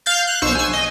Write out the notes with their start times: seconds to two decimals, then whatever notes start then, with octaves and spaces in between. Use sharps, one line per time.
0.06 F5 F6 G6 A6
0.27 F#6
0.42 B1 C5 C#6 E6
0.55 G#5 E6
0.73 D#5